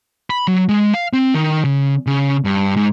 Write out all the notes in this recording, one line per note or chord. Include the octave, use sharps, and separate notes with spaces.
B5
F#3
G#3
F5
C4
D#3
C#3
C#3
G2
G#2